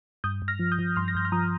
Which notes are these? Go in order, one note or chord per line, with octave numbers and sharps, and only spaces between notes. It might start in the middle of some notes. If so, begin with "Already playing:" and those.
G2 D#6 G6
G2
F6 A#6
F3
D#6 G6
F3
G2 C6 F6
A#6
G2 G6
F6
F3 A#5 D#6